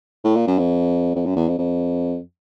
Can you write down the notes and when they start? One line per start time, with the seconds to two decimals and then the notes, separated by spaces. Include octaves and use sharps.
0.24 A2
0.36 A#2
0.47 F#2
0.58 F2
1.15 F2
1.26 F#2
1.36 E2
1.48 F2
1.59 F2